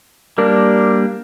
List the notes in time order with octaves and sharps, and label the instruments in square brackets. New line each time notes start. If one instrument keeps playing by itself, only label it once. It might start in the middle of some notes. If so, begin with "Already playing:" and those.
[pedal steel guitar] G3 A#3 D4 [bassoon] A#4